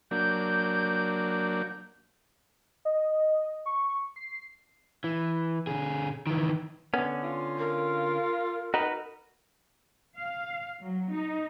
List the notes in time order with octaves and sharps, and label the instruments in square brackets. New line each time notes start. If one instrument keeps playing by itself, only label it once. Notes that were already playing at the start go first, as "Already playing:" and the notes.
[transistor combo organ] F#3 A#3 D4 [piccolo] G6
[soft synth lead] D#5
C#6
C7
[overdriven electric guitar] E3
D3 G#4
D#3 E3
[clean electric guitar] D3 C#4 [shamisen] B3
[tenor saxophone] F4
[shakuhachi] A#4
[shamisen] D#4 [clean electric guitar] F#4 B4
[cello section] F5
F#3
D#4